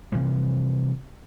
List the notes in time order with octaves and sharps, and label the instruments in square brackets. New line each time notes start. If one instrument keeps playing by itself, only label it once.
[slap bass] C3 E3 F3 G3